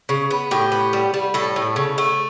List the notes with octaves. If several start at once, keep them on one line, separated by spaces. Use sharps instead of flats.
C#3
B3
A2 G4
B3
G3
G3
A2 A4
A2
C#3
A3